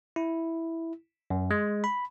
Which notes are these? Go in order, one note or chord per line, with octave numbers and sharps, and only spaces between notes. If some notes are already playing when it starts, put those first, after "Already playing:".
E4
F#2
G#3
B5